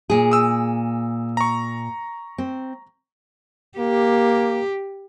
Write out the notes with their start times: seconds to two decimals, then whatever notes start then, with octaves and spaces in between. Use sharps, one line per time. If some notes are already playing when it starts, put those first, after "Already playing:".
0.10 A#2 G#4
0.31 D#6 E6
1.37 A#5 C#6
2.38 C4
3.79 A#3 G4